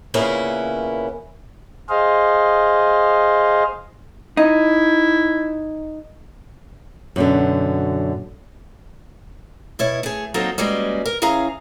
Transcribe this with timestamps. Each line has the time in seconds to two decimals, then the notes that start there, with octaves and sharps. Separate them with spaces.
0.14 A#2 C#3 A#3 B3 C#4 E4
1.89 G#4 C5 D#5 F5
4.37 D#4 E4
7.16 F#2 B2 D3
9.79 B2 E4 C#5
10.03 A3 G#4
10.34 F#3 A#3 C4 D#4 A4
10.58 G3 G#3 A#3 C#4 F#4 B4
11.06 A#4
11.22 E3 C#4 G#4 F5 A#5